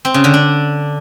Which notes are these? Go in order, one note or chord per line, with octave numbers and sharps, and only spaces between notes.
C4
C#3
D3
D4